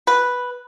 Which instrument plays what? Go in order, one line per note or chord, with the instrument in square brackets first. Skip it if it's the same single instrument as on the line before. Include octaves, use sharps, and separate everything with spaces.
[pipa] B4